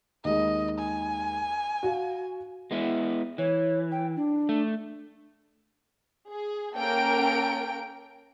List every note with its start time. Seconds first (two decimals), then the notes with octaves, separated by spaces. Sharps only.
0.25 D#2 G#3 D#5
0.79 G#5
1.83 F#4 F5
2.71 G#3 B3 E4
3.38 E3 C#5
3.91 G5
4.16 D4
4.49 A3
6.30 G#4
6.77 A#3 C#4 A4 A#4 G5 D7